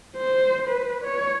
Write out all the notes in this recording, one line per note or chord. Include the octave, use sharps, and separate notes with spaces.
C5
B4
C#5